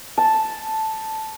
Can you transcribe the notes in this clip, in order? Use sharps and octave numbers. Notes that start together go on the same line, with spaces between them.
A5